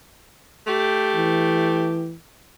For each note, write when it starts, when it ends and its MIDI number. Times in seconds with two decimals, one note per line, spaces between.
0.67 2.12 57
0.67 2.12 67
1.15 2.14 52